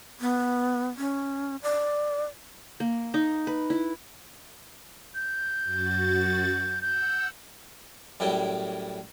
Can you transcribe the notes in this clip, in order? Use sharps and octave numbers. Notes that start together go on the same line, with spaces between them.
B3
C#4
D5
A#3
D#4
B4
E4
G6
F#2 F#4 A6
F#5 E6 G6
F#2 A2 G3 E4 G5